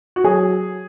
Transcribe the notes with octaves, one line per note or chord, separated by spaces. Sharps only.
F#4
F#3 G#4